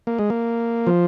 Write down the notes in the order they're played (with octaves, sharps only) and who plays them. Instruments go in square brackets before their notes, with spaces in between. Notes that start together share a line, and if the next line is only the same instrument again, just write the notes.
[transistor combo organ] A#3
G#3
A#3
F3